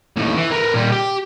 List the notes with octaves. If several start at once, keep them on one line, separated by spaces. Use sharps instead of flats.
D#2 A2
E3
A#4 B4
A#2 G3
G4